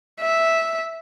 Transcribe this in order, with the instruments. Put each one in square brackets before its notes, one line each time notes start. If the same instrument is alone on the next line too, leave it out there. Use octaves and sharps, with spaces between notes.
[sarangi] E5